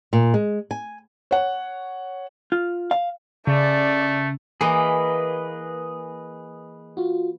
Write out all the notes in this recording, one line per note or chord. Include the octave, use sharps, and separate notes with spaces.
A#2
G#3
G#5
C#5 F#5
F4
F5
C#3 A3 D5
E3 A#3 G#4 B4 D#5
F4 F#4